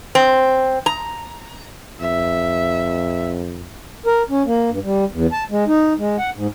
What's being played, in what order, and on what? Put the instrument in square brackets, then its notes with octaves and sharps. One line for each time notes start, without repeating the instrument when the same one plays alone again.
[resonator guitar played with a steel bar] C4
A#5
[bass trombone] F2 [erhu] E5
[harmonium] A#4
C#4
A#3
G2
G3
E2
A5
G#3
D#4
G#3
F#5
G#2